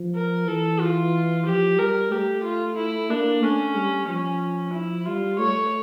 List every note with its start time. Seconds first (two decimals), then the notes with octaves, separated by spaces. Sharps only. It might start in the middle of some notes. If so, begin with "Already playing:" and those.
Already playing: F3
0.15 A#4
0.47 E3 A4
0.80 F4
1.46 F3 G4
1.78 G3 A#4
2.11 A3 G4
2.44 F4
2.77 E4
3.10 A#3 D4
3.42 A3 C#4
3.76 G3
4.08 F3 C#4
4.73 E4
5.06 G3 F4
5.39 A3 C#5